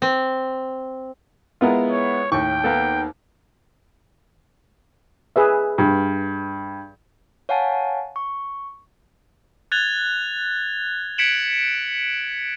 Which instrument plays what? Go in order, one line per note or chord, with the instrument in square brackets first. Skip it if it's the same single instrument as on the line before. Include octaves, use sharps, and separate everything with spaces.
[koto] C4
[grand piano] G#3 B3 E4 [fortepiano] F4 G#4 A#4
[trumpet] C#5
[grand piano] D#2 [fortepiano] A2 C#6 [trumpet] G5
[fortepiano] A#3 B3 A4
[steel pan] G#4 B4 E5
[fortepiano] G2
[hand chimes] C#5 F5 F#5 G#5 A5
C#6
[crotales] F#6 G#6 A6 F7 G7
G#6 B6 C#7 D7 E7 F#7